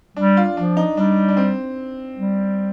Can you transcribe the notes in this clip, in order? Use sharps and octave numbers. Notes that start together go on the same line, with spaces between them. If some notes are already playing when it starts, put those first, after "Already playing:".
G3 D4
F4
F3 D4
D#4
G3 D4
D4
C4
G3